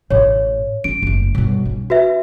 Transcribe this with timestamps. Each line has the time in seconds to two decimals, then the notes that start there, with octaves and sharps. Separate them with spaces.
0.10 A1 A2 C#5
0.84 C#4 D7
1.02 F#1 A3
1.35 B1 G2
1.65 C#4
1.90 F#4 B4 E5